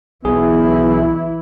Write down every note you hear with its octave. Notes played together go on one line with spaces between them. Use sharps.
B1 E3 B3 E4 G#4